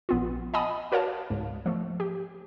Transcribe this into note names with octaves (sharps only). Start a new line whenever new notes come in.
A#1 B3 F4
D#5 F#5 G#5 A5 B5 D#6
F#4 A#4 C#5 D5 F5 A5
C#2 G#2
F3 A3
G4